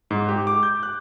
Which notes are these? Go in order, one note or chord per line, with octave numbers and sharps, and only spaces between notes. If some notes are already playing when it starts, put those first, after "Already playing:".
G#2
G4
D6
G6
F#6